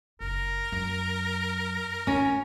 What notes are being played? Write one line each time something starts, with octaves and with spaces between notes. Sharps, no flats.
F#1 A#4
F#2
G#1 C#4